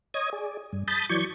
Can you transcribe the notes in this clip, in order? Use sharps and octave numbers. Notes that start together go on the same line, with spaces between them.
C#5 D#5 D#6 G#6
G#4 D5
G2
A5 B5 D#6 G6 A6
E3 F#3 D5 C#6 G6 G#6